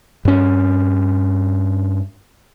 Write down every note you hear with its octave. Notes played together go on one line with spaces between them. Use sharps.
G2 C#4